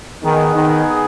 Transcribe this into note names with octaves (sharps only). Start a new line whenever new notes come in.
D#3 B3 D#4 G#4
D#3